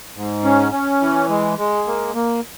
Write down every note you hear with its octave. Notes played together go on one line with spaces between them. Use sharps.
G#2
C#4
C#4
E3
G#3
G#3
A#3
A#3